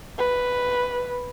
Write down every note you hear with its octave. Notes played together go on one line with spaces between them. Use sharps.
B4